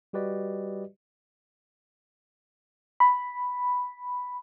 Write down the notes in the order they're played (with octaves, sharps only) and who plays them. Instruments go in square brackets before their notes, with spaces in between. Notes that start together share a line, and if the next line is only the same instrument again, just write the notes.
[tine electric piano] G3 F#4 G4 B4 D5 D#5
[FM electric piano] B5